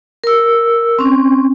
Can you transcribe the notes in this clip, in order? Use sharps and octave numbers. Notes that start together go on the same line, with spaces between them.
A#4 E6
C4 C#4